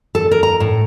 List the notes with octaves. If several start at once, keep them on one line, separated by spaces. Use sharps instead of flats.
A4
A#4
A#5
A2